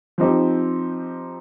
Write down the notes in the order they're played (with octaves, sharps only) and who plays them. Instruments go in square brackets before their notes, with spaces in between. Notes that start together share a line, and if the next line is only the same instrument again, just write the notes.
[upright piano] F3 C4 D#4 G4